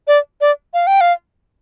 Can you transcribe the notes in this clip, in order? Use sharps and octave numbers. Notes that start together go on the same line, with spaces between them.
D5
D5
F5
G5
F5